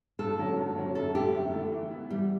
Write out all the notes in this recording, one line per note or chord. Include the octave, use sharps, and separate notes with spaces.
G2 A4
D3 F#3 C#4
G2
D3 F#3 C#4
F#2 A4
D3 A3 E4 G4 A4
F#2
D3 A3 E4 A4
E3
B3 E4
E3 G3